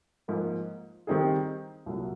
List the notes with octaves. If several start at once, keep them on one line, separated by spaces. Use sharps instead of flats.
G#2 F3 A#3
D#3 G3 C4 D#4 G#4
C2 A#2 F#3